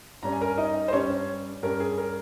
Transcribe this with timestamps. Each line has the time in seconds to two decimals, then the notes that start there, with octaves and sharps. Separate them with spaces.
0.23 G2 G3 C#4 A#5
0.33 G#5
0.41 A#4 A#5
0.58 D#4 D#5
0.88 C5
0.92 G2 G3 C#4 C#5
1.63 G2 G3 C#4 A#4
1.80 G#4
1.98 A#4